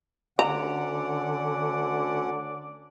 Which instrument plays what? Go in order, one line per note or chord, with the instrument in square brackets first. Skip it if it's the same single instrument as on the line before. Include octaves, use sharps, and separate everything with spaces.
[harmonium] D2 C#4 F#5 [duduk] D3 [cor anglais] D5 [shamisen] A#5